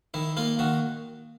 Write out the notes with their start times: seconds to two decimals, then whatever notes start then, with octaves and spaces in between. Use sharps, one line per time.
0.14 D#3 E4
0.37 A#3 F4
0.59 D#3 F#4